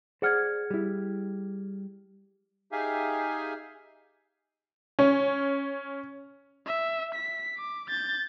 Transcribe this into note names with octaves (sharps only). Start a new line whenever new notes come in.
G#4 C5 D5 F#5 F6 G#6
G3 E4
D#4 G4 G#4 E5 F5 G#5
C#4
E5
B6
D6
G6 A6